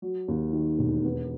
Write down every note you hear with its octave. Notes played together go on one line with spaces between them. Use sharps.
F#3
D#2
D#3
E1
B3